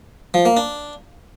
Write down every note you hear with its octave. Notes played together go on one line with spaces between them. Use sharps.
F3
A#3
D4